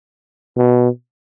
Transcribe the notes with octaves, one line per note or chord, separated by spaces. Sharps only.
B2